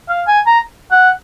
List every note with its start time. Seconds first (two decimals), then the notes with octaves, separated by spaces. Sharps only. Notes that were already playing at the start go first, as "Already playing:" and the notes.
0.09 F5
0.28 G#5
0.46 A#5
0.91 F#5